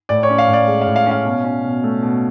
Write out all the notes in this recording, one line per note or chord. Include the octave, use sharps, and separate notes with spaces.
A2 D5
C#5
C#4
F5
A2
D5
G#3
F5
A2
F5
C#4 F5
B2
C#4
B2
A3
B2